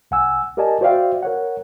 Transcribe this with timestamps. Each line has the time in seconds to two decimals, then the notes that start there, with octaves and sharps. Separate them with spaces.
0.11 C2 F#5 G#5 E6
0.57 G4 A#4 D5 D#5 G#5 A5
0.81 F#4 C5 D5 E5 F5 G5
1.23 A#4 C#5 F#5